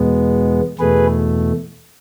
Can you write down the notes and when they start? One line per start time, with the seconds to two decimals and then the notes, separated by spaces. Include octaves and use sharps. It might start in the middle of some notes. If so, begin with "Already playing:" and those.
Already playing: E2 B2 G#3 B3
0.79 E2 B2 A3 G#4 B4